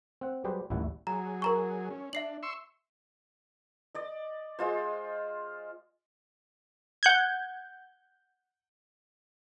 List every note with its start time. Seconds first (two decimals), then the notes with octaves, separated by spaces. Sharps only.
0.21 C4 F#5
0.44 F#3 G3 G4 G#4 B4 C5
0.70 A1 D#2 G3 E4 F#5
1.07 F#3 G#4 A#5
1.42 A#4 A#5 C#6
1.90 C#4
2.13 D4 E5 C7 F#7
2.43 C6 C#6 E6
3.95 D5 D#5
4.59 G#3 F4 C5
7.03 F#5 G6 G#6